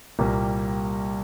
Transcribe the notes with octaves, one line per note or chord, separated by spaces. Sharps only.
C2 A#2 G3 A#3